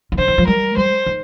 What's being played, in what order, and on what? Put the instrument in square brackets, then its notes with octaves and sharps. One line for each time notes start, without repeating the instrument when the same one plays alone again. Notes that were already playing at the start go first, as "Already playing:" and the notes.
[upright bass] D#3
[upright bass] D3 [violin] C5
[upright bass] D#3
F3
[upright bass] G3 [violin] A#4
[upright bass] G3 [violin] C5
[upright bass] D#3